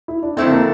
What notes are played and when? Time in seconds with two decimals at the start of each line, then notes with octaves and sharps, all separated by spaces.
0.08 E4
0.23 D4
0.37 F2 D3 A3 C4 E4 A4
0.52 A#3